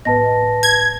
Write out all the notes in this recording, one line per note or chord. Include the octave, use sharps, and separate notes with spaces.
A2 B3 B4 D#5 A5 A#6
G#6